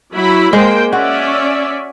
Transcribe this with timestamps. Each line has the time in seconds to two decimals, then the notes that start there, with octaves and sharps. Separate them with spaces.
0.14 F#3 E4 B5
0.53 G#3 A#3 C5 G5
0.93 C#4 F#4 D5 E5